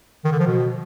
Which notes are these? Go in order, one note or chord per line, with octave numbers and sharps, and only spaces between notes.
D#3
D3
F3
B2